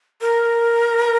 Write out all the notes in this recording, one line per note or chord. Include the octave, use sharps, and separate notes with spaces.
A#4